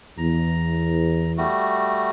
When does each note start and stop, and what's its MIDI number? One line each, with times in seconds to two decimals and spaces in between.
0.18 1.43 40
0.18 1.32 82
1.38 2.11 55
1.38 2.11 57
1.38 2.11 66